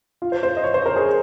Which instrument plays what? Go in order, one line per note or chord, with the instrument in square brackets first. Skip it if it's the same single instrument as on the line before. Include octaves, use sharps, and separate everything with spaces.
[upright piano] F4
C5
C5
D#5
C#5
C5
A#4
G#4